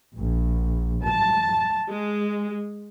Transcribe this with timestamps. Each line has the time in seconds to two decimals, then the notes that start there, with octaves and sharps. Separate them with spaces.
0.17 A#1
1.05 A5
1.90 G#3